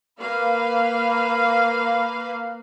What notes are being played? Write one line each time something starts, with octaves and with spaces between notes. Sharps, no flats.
A#3 B4 F5